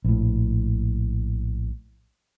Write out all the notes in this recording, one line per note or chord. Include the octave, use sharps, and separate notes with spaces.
A#1 A2